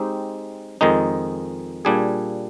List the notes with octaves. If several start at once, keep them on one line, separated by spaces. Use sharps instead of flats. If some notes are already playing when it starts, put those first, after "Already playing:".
Already playing: G#3 C4 D#4 G4
F2 D#3 G#3 D#4
A#2 G3 D4 G#4